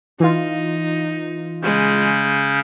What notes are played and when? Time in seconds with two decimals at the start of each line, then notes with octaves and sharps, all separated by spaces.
0.20 E3 D#4 F4
1.62 C#3 G#3 C#4 G6